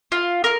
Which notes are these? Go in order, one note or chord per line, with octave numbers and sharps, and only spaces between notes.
F4
A#4